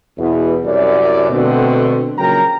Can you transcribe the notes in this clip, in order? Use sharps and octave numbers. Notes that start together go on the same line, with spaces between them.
E2 B2
C2 F#2 D5
B2 D3 A3 C4
A#1 C#3 F#3 A#4 G5 A#5